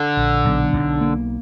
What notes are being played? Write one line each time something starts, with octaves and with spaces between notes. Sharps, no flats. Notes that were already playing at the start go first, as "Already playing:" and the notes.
Already playing: D3
A#1
B1
B1
A#3